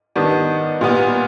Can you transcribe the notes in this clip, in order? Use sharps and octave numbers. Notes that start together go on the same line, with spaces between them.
D#3 G3 B3 D4
A#2 G3 B3